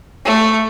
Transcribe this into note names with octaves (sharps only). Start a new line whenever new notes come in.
A3